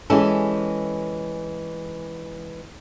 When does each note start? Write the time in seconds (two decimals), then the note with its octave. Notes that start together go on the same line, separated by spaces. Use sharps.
0.10 E3 G#3 C#4 G4 A4